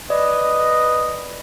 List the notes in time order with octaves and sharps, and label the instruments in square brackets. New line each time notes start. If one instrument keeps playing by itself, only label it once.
[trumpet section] B4 D#5 [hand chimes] D5